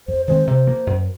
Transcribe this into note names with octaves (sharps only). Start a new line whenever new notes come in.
F2 C5
D#3 G#3 C4 C5
C3
F3 A#3
F#2